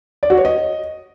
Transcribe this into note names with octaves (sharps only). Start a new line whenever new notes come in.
D5
F#4
C#5
D#5